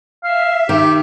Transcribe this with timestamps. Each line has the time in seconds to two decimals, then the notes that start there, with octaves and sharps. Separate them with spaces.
0.24 E5 F5
0.69 D#3 G4